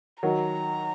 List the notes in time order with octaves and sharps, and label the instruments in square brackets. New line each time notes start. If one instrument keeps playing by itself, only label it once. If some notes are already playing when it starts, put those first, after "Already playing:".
[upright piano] D#3 F#3 [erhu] A#5